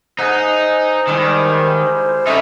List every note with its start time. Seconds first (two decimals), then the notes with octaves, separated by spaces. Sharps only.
0.19 D#4 G#4 C5 E5 F#5
1.08 D#3 G3 G#3 E4
2.27 C#4 D#4 A4 B4 C#5 E5